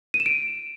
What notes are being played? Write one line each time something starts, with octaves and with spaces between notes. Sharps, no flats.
D#7
E7
D7